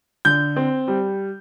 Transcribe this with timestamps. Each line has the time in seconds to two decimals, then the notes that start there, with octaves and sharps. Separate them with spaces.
0.25 D3 G6
0.56 C4
0.88 G3